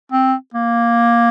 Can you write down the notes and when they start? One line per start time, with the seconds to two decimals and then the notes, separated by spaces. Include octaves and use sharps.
0.12 C4
0.54 A#3